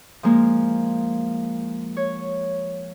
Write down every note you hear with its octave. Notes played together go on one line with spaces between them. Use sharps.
F3 G#3 A#3
C#5